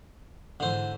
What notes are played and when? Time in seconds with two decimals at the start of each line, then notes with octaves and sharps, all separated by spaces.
0.60 G#2 D3 E3 C5